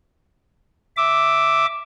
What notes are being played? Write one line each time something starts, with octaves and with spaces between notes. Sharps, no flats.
E5 D6